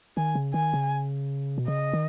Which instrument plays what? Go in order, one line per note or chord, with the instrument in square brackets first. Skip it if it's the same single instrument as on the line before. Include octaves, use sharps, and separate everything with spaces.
[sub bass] D#3 [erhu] G#5
[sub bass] C#3
[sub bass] D#3 [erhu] G#5
[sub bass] C#3
B2
[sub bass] C#3 [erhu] D#5
[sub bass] D#3